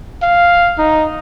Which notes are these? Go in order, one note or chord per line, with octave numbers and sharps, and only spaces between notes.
F5
D#4